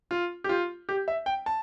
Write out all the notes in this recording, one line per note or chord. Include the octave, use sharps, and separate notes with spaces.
F4
G4
F4
G4
E5
G5
A5